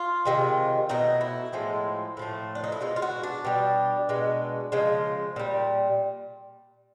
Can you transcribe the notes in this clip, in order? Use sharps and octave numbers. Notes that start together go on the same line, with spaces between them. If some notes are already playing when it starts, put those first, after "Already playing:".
Already playing: F4
C3 D#3 G#3
B2 F#3 A3 D#4
E4
A2 F3 G#3
A2 F3 A3
D4
D#4
E4
B2 G#3 F4
F4
F#4
D4
B2 G3
B2 G#3
C#3 F3 G#3
A#2 G3